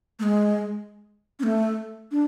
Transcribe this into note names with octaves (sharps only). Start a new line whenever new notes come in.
A3
G#3
C#4
A3
D4